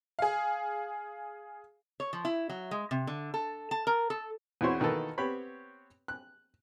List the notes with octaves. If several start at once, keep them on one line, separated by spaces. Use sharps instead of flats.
G#4 F5
C#5
F3
E4
F#3
G#3
C3
D3
A4
A5
A#4
A4
E2 C4 E4 F#4 C5 C#5
B2 D#3 E3 A#3 A4
B3 C4 G4 C#5 B5
F#6